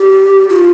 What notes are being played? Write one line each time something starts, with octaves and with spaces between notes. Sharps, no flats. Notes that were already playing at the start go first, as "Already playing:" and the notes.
Already playing: G4
F4